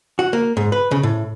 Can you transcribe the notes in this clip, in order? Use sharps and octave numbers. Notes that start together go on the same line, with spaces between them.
F#4
A#3
G#2
B4
C#3
A2